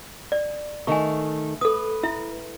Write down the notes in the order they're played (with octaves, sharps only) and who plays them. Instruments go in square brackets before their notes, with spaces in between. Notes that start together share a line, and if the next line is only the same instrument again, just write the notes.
[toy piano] D5
[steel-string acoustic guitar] D#3 A3 A4 [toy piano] G#5 C#6
[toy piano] A4 D#6 [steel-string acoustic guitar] B4
[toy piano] E4 E5